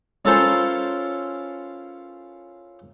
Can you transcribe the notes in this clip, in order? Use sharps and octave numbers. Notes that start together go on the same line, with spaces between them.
C#4 E4 F4 A4 A#4 C5